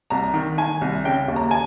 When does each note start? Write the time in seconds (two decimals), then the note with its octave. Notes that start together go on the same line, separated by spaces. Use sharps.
0.10 C2 A#5
0.34 D#3
0.58 D#3 G#5
0.81 C2
1.04 C#3 G5
1.28 D#2
1.36 A#5
1.51 G#5